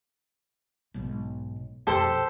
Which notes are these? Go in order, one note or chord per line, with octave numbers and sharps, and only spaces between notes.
B1 G#2
B1 F2 G4 A4 C5